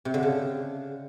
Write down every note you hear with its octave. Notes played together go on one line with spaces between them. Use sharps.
C3
D3
C#3